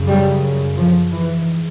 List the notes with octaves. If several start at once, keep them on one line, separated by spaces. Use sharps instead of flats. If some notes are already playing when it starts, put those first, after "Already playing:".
Already playing: F#2 C#3
G3
F3
G#2 E3